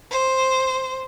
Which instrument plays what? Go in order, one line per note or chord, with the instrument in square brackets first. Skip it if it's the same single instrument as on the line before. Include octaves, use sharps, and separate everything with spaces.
[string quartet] C5